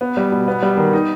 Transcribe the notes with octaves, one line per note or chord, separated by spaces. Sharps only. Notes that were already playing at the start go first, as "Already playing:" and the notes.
B3
G3
B2
B3
G3
D#3
D#4